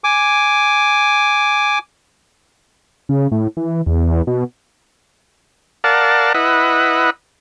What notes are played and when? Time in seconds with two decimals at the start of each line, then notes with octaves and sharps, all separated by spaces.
0.04 G#5 D6
3.09 C#3
3.32 A2
3.57 E3
3.86 E2
4.27 B2
5.84 A#4 D5 F5 F#5 A5
6.34 E4 B4 D#5 F#5